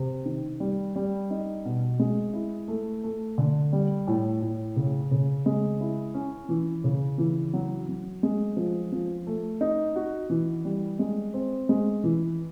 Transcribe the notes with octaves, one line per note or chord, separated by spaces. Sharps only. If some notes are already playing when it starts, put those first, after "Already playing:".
Already playing: C3
D#3
G3
G3
D#4
B2
G#3
E4
A3
A3
D3
G3
A2
A2
C#3
C#3
G#3
E4
C#4
E3
C#3
E3
F#3
F#3
G#3
F3
F3
A3
D#4
F#4
E3
G3
G#3
C4
G#3
E3